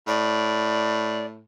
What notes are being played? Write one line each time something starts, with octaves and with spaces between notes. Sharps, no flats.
A2 D5